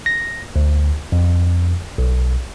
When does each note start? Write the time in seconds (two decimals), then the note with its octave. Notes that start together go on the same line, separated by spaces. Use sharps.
0.06 A#6
0.56 D2
1.12 F2
1.98 B1